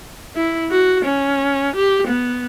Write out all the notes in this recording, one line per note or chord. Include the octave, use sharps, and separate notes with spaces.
E4
F#4
C#4
G4
B3